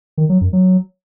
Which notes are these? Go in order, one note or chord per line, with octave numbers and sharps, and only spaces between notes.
D#3
F#3
F#2
F#3